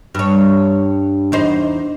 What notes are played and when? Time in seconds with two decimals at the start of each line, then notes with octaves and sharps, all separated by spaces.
0.15 G2 C#5
1.32 E2 D#4 C5